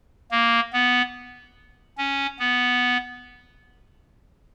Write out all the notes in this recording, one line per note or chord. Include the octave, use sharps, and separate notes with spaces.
A#3
B3
C#4
B3